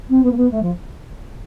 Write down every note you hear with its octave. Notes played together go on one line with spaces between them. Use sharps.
C4
B3
A#3
B3
A3
F3